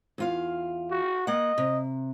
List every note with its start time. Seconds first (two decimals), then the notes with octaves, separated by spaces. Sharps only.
0.18 E2 F4 F5
0.91 F#4
1.27 A#3 D#5 F#5
1.58 C3